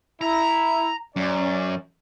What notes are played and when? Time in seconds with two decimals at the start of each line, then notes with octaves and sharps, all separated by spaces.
0.21 E4 A#5
1.16 F#2 C#4 D5